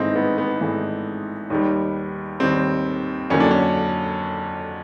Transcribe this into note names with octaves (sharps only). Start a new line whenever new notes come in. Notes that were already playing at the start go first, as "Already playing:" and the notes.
Already playing: G#1 G#2 E3 A3 C4 D#4
B3
B3
G#1 G#2 E3 A3
D#2 D#3 G3
D#2 D#3 G3 C4
F2 D3 F#3 A#3 C#4
D4
C#4